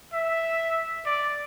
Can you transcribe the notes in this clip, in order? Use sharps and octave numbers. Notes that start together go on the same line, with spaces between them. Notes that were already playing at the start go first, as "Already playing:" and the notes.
E5
D5